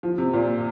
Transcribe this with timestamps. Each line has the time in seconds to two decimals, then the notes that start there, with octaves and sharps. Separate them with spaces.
0.03 F3
0.18 C3
0.33 A#2